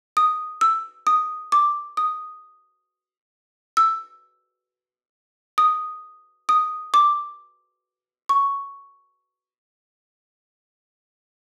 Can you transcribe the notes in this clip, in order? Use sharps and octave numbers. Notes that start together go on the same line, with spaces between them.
D#6
E6
D#6
D6
D#6
E6
D#6
D#6
D6
C#6